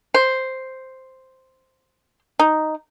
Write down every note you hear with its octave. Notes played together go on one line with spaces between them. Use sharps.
C5
D#4